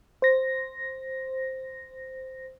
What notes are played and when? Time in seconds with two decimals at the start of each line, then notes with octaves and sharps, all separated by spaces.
0.22 C5 A#6